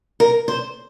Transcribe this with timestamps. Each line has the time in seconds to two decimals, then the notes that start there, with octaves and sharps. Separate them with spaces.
0.20 A#4
0.48 C5